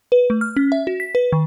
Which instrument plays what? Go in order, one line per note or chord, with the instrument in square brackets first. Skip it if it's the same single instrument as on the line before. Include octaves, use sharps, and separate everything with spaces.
[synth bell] B4
A3
F6
C#4
E5
F#4
B6
B4
D#3